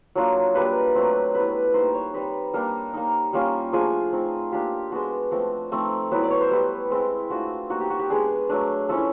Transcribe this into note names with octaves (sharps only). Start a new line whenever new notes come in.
F#3 A#3 D4 F4
G3 A#3 D4 B4
F#3 A3 C4
G3 B3 E4 B4
G3 A#3 D#4 C5
C#5
G3 C4 D#4 B4
G3 A#3 D4 A#4
A#3 D#4
G3 A#3 C#4 F4
F3 A3 D4 F4 G#4
A3 C4 D#4
A#3 D4 F4 G4
G#3 B3 D4 F#4
F3 A3 C4
F3 A3 C4 D#4
F#3 B3 E4
D5
C#5
C5
G3 B3 E4
G#3 C4 E4
A3 D4 F4 F#4
G3 A#3 D#4 F#4
G4
F#4
G4
G#3 B3 D4 G#4
F#3 A3 D4
F3 A3 C#4 E4 A4